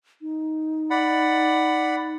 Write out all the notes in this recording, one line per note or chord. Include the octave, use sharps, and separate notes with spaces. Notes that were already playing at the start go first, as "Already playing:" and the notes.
D#4
D5 F#5 B5